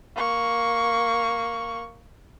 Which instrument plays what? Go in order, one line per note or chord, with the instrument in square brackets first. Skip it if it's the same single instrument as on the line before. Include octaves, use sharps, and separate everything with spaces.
[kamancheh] A#3 C#6